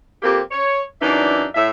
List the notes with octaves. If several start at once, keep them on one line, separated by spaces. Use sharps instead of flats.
F2 A#3 C4 G4
C#5
F#2 E3 D4 D#4 D5 E5
A2 E5